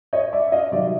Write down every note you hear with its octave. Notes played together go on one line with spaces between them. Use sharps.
C#5 D#5
D5 E5
D#5 F5
C3 D#3 F#3 D5 E5